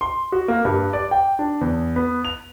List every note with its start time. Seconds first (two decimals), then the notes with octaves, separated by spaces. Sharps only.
0.01 C6
0.32 F#4
0.48 A#3
0.65 G2
0.93 D5
1.11 G5
1.39 D4
1.61 E2
1.96 B3
2.25 F7